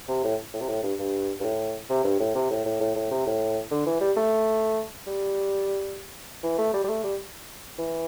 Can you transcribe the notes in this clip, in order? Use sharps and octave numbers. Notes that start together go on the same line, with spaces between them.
C3
A2
A2
C3
A2
G2
G2
G2
A2
C3
G2
A2
C3
A2
A2
A2
A2
C3
A2
D3
E3
G3
A3
G3
E3
A3
G3
G3
A3
G3
E3